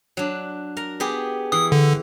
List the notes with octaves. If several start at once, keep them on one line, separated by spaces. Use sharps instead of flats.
F#3 D4
A#4 A#5
B3 G4 G#4
E3 D#6
D3